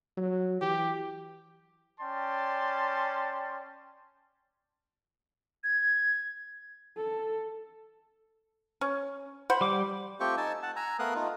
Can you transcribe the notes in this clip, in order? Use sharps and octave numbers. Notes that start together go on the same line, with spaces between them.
F#3
E3 G4
C#4 D5 G5 A5 C6
G#6
A4
C#4
C5 F#5 B5
G3 D6
A3 C4 F4 G4 G5 C#6
D#4 G#5 A5 E6
F#5 A5
G#5 A#5 E6
A3 B3 A#4 F5 D#6 F#6
A3 D#4 F4